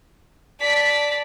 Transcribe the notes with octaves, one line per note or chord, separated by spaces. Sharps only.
D5 A5 B6